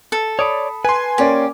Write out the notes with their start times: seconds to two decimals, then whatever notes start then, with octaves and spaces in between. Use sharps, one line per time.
0.12 A4
0.39 C#5 D5 B5 D#6
0.85 B4 G#5 C6
1.18 A#3 C#4 G4 D5